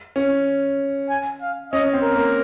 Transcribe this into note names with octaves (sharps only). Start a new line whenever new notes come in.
C#4
G#5
F5
C#4 D#5
C4
A#4
A#3